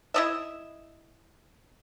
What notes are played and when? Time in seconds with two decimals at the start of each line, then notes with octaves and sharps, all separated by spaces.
0.14 E4 D#5 E5